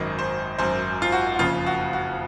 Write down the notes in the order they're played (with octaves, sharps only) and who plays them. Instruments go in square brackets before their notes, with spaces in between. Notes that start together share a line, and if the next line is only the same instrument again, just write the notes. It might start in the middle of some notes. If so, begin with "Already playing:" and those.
Already playing: [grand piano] G#1 F#2 D#3 D#5
C5
G#1 F#2 D#3 C5
F4
F#4
F#4
F#1 F2 C#3 F4
F#4
F#4